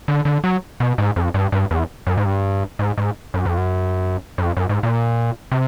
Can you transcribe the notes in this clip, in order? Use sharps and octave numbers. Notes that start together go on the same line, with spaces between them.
D3
D3
F#3
B2
G#2
F2
G2
G2
E2
F#2
G#2
G2
G#2
G#2
F#2
F2
F#2
F#2
F2
F#2
G#2
A#2
C3